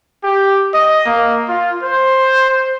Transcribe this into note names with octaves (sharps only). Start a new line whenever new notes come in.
G4
D#5
A#3
F4
C5